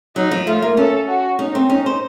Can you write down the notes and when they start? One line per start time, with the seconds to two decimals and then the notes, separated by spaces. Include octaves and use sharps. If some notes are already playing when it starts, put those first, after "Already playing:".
0.16 F#3 D#4
0.31 F3
0.47 A3 F4
0.62 A#3
0.77 C#4 A4
1.08 F#4
1.39 C#4 D#4
1.55 C4
1.70 C#4 D#4
1.86 C5